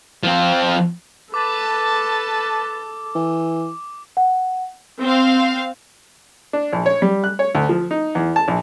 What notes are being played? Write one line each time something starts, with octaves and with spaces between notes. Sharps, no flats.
F3 C4
A4 B4 A5 D6
E3
F#5
C4 F5
D4
A#1
C#5
G3
F#6
C#5
D2
F3
D#4
E2
A5
A#1